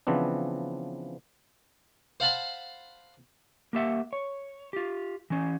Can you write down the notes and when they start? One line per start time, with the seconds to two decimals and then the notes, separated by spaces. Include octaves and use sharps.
0.07 C#3 E3 F3 B3 C4 D4
2.20 C5 F5 F#5 A5 B5 C6
3.73 A#3 G4 E5 F#5
4.13 C#5
4.73 F4 G4
5.30 E3 C#4